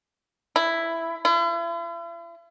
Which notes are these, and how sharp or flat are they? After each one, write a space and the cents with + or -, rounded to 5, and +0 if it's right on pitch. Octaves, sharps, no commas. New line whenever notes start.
E4 +5
E4 +45